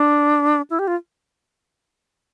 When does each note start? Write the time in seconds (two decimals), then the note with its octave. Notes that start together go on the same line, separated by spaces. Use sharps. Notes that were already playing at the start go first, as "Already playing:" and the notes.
Already playing: D4
0.70 E4
0.79 G4
0.87 F4